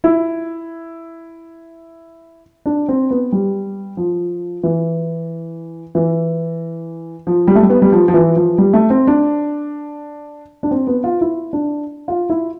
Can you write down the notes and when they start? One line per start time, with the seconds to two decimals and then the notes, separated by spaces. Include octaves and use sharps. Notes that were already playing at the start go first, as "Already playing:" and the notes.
0.04 E4
2.66 D4
2.89 C4
3.11 B3
3.32 G3
3.97 F3
4.63 E3
5.95 E3
7.27 F3
7.48 G3
7.55 A3
7.63 G3
7.70 B3
7.82 G3
7.92 F3
8.08 F3
8.14 E3
8.36 F3
8.58 G3
8.73 A3
8.90 C4
9.07 D4
10.63 D4
10.71 C4
10.87 B3
11.04 F4
11.21 E4
11.53 D4
12.08 F4
12.30 E4